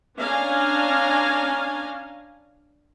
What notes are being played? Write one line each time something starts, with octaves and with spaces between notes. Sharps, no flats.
C#4 D4 F5 G#5 A#5